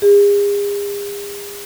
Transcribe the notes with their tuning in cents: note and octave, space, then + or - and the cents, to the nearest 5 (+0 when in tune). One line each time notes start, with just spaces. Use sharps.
G#4 -40